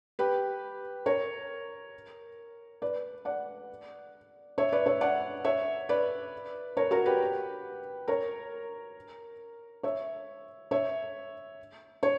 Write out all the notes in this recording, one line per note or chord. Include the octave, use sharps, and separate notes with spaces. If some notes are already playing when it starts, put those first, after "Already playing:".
G4 B4
A#4 C#5
B4 D5
D5 F#5
C#5 E5
B4 D5
C#5 E5
D5 F#5
C#5 E5
B4 D5
A#4 C#5
F#4 A#4
G4 B4
A#4 C#5
C#5 E5
C#5 E5
C#5